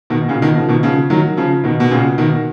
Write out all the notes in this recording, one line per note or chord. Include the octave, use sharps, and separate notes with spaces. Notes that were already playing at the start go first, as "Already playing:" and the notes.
B2 D#3
A#2 C#3
B2 D#3
C#3 F3
B2 D#3
C#3 F3
D#3 F#3
C#3 F3
B2 D#3
B2
A#2 C#3
B2 D#3